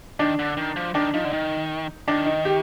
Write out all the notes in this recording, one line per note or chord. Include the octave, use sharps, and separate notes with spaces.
D#3 D4
D3
D#3
F3
D#3 D4
F3 D#4
D3
D#3
D#3 D4
D#4
G4